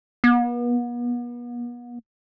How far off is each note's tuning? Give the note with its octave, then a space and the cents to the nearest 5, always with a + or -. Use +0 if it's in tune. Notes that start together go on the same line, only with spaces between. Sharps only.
B3 -40